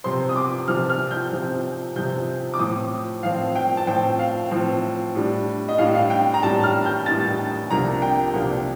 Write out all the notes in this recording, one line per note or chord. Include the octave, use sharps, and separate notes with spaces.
C3 F3 C4 C6
D#6
D6
C3 F3 C4 F6
F6
G6
C3 F3 C4
C3 F3 C4 G6
D6
A2 F3 C4 D#6
A2 F3 C4 F5
G5
A5
A2 F3 C4 G5
F5
A2 F3 C4
A2 G3 D4
D#5
A2 G3 D4 F5
F5
G5
A#5
A2 G3 D4 A5
F6
G6
A2 G3 D4 A6
C2 C3 F3 A#3 D4 A#5
G5
C2 C3 F3 A#3 D4